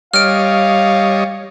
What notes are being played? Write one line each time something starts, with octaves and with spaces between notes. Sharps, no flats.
G3 C#5 D#5 F5 F6 D7